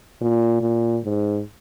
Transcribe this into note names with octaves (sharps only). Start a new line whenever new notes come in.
A#2
A#2
G#2